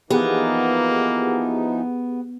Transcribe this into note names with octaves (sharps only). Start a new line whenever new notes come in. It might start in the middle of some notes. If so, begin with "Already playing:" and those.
E3 F3 A#3 B3 D#4 G4 G#4 F#5